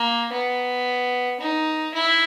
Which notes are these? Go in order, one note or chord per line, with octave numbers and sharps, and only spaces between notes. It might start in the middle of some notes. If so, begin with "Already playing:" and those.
Already playing: A#3
B3
D#4
E4